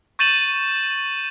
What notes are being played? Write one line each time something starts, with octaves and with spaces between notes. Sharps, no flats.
C#6 G6 A6 D#7 E7 F#7